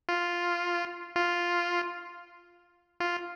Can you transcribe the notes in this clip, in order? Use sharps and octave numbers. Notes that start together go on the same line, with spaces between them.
F4
F4
F4